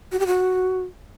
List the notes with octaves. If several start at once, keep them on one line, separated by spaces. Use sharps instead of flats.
F#4
G4
F#4